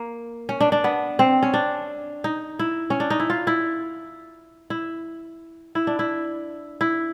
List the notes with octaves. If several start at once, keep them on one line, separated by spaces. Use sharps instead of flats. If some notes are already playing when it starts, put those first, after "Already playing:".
Already playing: A#3
C#4
D4
D4
B3
C4
C#4
D4
D#4
E4
C#4
D4
D#4
E4
F4
E4
E4
E4
D4
E4
E4